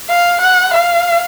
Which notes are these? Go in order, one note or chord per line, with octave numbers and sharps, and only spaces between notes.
F5
F#5
F5